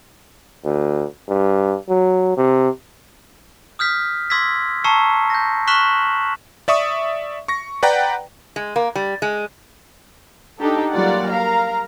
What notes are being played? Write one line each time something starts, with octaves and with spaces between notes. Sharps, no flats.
D2
G2
F#3
C3
D#6 F6 G6 B6
C6 D6 E6 G#6 A#6 B6
A5 A#5 C#6 E6 C7 C#7
G6 A#6
C#6 F6 F#6 B6 E7 F#7
D5 E5 C#6 D#6
C#6 A#6
B4 D5 F#5 G5 A#5
G#3
A#3
G3
G#3
D4 D#4 G4 A4
F#3 G3 A#3 F4 D5 F#5
A#4 F5 A#5